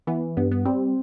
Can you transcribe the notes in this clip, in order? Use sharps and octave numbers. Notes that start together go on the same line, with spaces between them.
E3 B3
G2 B3
B3
G3 C4